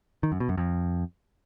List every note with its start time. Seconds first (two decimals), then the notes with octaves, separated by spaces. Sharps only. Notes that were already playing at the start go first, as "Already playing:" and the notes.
0.23 D#3
0.32 F#2
0.40 B2
0.49 F#2
0.58 F2